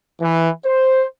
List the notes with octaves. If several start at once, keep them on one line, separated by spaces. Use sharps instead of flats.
E3
C5